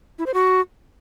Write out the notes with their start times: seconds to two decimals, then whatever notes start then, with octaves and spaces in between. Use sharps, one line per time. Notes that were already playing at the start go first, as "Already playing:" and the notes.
0.19 E4
0.26 C5
0.34 F#4